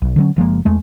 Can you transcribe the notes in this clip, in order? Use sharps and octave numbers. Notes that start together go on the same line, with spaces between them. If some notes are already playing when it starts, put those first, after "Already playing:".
B1
D3 F#3 C#4
F#1 F3 G#3 A#3
E2 G#3 A3